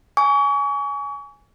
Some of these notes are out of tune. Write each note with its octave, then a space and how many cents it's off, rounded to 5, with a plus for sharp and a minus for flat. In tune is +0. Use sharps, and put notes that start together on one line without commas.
G#5 +0 C#6 +40